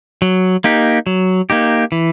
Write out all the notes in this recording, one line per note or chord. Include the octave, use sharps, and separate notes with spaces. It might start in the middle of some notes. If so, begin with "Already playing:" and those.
F#3
A#3 D#4 G4
F#3
A#3 D#4 G4
E3